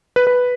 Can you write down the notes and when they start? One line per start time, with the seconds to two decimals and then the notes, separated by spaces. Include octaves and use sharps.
0.16 B4
0.27 B4